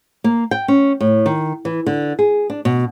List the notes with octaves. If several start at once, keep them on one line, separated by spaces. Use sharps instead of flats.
A#3
G5
C#4
A2
D#3
E3
D3
G#4
D4
B2